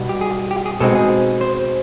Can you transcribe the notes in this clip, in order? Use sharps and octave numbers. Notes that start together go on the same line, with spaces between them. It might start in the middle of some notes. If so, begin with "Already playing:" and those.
Already playing: B2 G3 B3 D#4
G4
G#4
G4
G#4
B2 G#3 C4 D#4 A4
G#4
C5